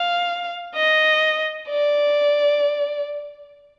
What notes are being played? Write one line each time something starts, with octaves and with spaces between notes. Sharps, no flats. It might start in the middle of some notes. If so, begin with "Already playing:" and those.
Already playing: F5
D#5
D5